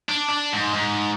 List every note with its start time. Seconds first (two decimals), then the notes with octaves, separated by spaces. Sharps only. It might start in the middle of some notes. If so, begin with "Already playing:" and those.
0.09 D4
0.29 D4
0.53 G#2
0.74 G#2